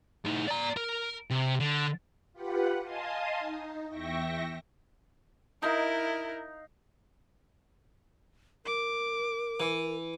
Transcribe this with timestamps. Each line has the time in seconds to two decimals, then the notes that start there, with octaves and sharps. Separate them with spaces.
0.25 A2 D#4
0.47 D5 A#5
0.77 A#4
1.30 C3
1.60 D3
2.33 F4 G4 B4 F#5
2.84 D#5 F5 G#5 A5 C6 D#6
3.39 D#4
3.89 E2 E5 G5 C#6 A#6
5.62 D#4 E4 A#4 F5
8.66 A#4 D6
9.60 E3